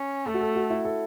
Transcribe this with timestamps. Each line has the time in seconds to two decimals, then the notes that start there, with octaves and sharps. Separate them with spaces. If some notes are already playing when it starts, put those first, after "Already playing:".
Already playing: C#4
0.26 A3 A4
0.34 F#4
0.41 A4
0.55 F#4
0.70 E4
0.85 A4